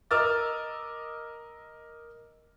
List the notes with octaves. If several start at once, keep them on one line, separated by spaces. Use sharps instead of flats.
A#4 D#5 D6 E6 F6 A6